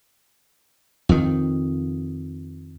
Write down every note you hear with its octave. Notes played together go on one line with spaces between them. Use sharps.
F2 D#3